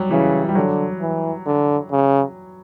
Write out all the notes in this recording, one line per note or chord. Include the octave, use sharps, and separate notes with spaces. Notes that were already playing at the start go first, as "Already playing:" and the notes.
Already playing: F#3 G3
C#3 E3
G3
D3 F#3
E3
D3
C#3